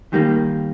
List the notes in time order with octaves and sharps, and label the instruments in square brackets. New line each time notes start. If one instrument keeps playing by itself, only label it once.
[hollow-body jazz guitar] D#3 G3 A#3